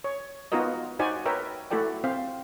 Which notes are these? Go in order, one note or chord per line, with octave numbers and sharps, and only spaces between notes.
C#5
B3 D#4 F4 F#4 A#4 D#5
D#4 F#4 C5 D5 G#5
A#4 B4 C#5 E5 G5
A3 E4 F#4 A4 D5 G5
C4 C5 F5